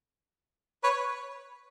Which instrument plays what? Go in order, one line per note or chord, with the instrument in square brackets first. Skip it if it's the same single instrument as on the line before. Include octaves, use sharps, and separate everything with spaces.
[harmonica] B4 C#5